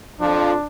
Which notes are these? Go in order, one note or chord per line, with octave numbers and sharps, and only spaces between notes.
F2 F3 D4